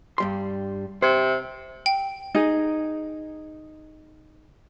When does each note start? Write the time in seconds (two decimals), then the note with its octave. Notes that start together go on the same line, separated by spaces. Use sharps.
0.18 G2 G3 C6
1.02 C3 C5
1.86 G5
2.35 D#4 G#4